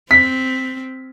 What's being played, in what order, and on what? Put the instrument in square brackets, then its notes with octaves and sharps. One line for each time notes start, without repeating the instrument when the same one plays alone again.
[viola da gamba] C4 [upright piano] B6